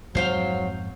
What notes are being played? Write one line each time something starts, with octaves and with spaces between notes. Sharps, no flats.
F2 G#2 F#3 C4 C5 F5 G5